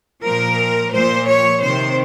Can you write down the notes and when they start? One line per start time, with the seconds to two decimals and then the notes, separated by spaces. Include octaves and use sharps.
0.23 A#2 F3 A#4
0.92 A#2 F3 C5
1.27 C#5
1.62 C3 D#3 C5